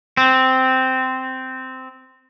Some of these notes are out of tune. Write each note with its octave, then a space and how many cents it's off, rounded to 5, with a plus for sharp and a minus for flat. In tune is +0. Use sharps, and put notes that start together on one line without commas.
C4 -10